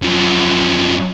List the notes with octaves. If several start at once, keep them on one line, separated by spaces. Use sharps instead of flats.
F#2 F3